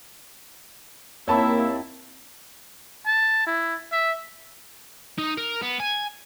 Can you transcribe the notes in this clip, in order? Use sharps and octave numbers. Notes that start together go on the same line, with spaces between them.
D#2 A#3 C4 E4 C#5 E5 A5 B5
A5
E4
E5
D#4
A#4
B3
G#5